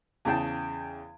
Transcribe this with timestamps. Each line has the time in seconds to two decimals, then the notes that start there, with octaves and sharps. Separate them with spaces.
0.25 E2 C#3 G#4 G5 A5